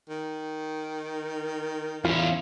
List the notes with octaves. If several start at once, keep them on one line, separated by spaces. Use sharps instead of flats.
D#3
E2 C#4 E4 F4 F5